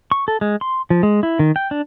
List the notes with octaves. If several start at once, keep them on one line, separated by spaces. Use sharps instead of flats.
C#6
A4
G#3
C6
F3
G#3
E4
D#3
G5
D4